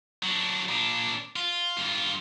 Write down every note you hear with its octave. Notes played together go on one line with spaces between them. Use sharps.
F#3 D4
A#2 D4
F4
G2 F4